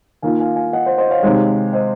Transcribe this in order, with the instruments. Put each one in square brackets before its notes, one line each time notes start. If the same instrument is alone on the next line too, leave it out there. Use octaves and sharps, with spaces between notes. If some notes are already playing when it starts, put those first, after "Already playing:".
[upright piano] D#3 A#3 F4 [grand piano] F5 G#5
[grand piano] F5 G#5
F5 G#5
D#5 F#5
C5
C5 D#5
C#5 F5
[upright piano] C3 D#3 G#3
[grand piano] C5 D#5